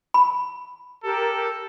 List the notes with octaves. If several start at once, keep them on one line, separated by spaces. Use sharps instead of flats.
B5
G4 A4 A#4